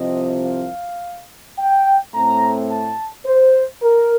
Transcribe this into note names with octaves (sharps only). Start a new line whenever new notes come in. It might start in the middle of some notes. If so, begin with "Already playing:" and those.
Already playing: C2 C3 F3 C4 D#5
F5
G5
A2 A3 C4 A#5
A5
C5
A#4